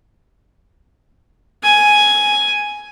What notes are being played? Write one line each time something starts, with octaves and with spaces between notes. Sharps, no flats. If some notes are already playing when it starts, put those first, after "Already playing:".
G#5